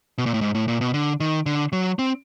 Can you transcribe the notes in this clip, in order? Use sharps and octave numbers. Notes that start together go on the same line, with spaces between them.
B2
A#2
A2
G#2
A2
A#2
B2
D3
D#3
D3
F#3
C4